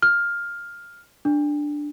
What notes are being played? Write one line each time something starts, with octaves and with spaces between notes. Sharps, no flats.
F6
D4